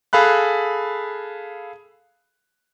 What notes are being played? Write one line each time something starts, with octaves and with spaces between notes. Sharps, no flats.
G#4 A4 F5 B5 F#6